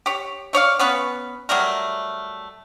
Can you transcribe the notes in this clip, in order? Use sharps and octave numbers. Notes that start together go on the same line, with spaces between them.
G4 C#5
A3 C#5 D5 F5
B3 C#4 B4
F#3 G3 A3 A#4